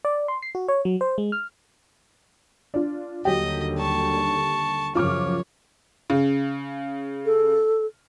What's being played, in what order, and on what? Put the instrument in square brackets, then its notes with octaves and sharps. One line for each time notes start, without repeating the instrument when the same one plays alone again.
[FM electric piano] D5
C6
C7
F#4
C#5
F#3
C5
G#3
F6
[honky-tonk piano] D4 F4
[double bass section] D#2 D3 G3 [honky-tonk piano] F#3 G4 [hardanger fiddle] D#5
[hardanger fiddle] A5 C#6
[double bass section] F#2 C#3 F3 [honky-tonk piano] F4 D6 F6 [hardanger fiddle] C#5
[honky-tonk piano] C#3
[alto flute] A4